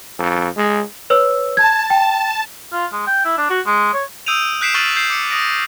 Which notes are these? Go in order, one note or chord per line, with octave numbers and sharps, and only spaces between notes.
F2
G#3
B4 C#5 E6
A5 G#6
G5
F4
G#3
G5
E4
D4
F#4
G#3
C#5
D#6 E6 G6 D7 D#7 F7
F#6 G6 B6 C7 D7 E7
C#6 F6 A6 D#7 F#7
G6 C7
D6 C#7
D#6 A#6 D7